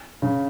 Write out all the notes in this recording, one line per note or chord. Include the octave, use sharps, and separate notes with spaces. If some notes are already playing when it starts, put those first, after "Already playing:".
C#3